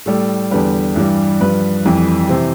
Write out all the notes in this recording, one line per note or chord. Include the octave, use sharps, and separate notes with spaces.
A2 G3 A4
E2 D3 G3 B4
G2 E3 G3
G2 F3 B4
F2 E3 G3
C3 E3 C5